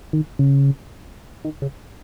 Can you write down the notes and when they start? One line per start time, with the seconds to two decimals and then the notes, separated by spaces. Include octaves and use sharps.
0.13 D#3
0.39 C#3
1.45 D#3
1.62 C#3